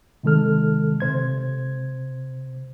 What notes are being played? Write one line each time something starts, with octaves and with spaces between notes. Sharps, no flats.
C3 D#3 G#3 A4 F6
C3 C5 G#6